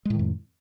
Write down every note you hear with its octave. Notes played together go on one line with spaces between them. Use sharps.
F2 A2 D#3 G#3